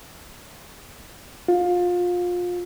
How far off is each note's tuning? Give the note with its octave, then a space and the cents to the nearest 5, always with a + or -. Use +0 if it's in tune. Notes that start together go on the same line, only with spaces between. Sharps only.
F4 +25